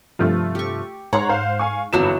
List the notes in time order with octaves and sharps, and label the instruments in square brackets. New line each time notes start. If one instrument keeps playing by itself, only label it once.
[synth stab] G2 C3 F3 [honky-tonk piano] A3 F4
[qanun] G4 C#6
[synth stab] G#2 [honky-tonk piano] C#5 A#5 C6 [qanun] F#5
[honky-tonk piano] C5 F5
F5 G#5 C#6
[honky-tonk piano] G1 F2 E7 [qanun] E3 F#3 F#4